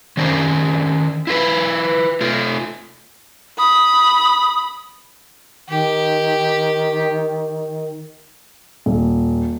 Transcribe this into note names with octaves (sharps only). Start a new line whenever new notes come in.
D#3 C#4 D4 C5
E4 F4 A#4 B4
A3 F4
B5 D#6
D#3 G4
D#1